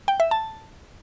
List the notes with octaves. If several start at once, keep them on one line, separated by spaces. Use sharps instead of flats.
G5
E5
A5